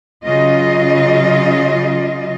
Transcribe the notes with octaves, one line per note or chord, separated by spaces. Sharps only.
C#3 F#3 F4 D#5